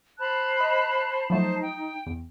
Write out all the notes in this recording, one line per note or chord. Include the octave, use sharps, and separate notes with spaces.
C5 A5 B5 F#6
D#5
F3 F#3 A3 D#4 C5 A5
G5
E2